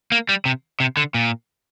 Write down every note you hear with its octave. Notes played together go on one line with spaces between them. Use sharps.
A#3
G3
C3
C3
D3
A#2